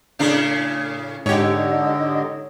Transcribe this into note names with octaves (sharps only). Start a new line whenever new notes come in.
A2 C#3 D4
G#2 D3 D#4 G4 C#5 D#5